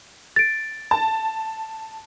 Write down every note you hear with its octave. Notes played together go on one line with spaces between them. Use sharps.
A6 D7
A5